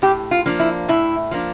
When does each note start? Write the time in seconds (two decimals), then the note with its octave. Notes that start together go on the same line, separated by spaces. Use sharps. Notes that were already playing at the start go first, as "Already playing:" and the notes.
0.02 A2 G4
0.31 F4
0.46 F3 A#3 D4
0.60 E4
0.88 A2 E4
1.31 F3 A#3 D4